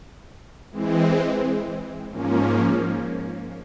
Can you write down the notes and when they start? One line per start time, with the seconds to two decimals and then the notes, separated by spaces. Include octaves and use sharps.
0.72 E3 G#3 C4
2.11 G#2 F3 A#3 C#4